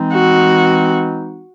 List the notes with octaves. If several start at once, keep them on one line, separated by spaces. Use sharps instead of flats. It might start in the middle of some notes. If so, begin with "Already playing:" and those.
Already playing: E3 G#3 C4 D#4
F#4